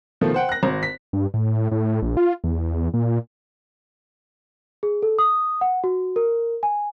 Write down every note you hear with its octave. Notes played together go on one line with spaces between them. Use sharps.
B2 D#3 F3 A3
C5 F#5 G5
F#6 A#6
G#1
B6
G2
A2
A2
A#1
F4
E2
A#2
G#4
A4
D#6
F#5
F#4
A#4
G#5